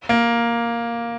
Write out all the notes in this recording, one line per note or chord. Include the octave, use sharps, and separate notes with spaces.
A#3